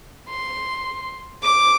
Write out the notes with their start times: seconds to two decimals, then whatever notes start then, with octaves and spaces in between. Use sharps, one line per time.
0.29 C6
1.43 D6